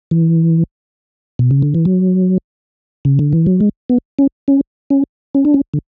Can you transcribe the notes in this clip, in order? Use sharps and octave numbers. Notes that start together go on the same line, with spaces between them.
E3
B2
C#3
D3
E3
F#3
C#3
D3
E3
F#3
G#3
B3
C#4
C#4
C#4
C#4
D4
C#4
D3